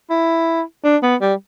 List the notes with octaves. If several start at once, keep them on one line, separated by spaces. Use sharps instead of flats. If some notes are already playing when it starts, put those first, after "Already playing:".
E4
D4
B3
G3